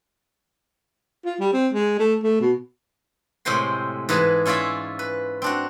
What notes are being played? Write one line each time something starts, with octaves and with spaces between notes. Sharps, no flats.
F4
G3
C4
G#3
A3
A3
B2
A2 C3 G#3 C5 G5 C6
G#2 E3 G#4 B4 A5 B5
C#4 E4 F4 D5 E5
B4
C4 D4 F#4